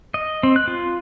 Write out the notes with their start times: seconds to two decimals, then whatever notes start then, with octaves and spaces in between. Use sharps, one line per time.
0.14 D#5
0.43 C4
0.56 F#6
0.68 F4